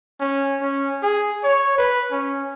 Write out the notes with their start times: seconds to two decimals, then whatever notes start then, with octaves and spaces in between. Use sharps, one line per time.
0.20 C#4
0.61 C#4
1.03 G#4
1.44 C#5
1.78 B4
2.11 C#4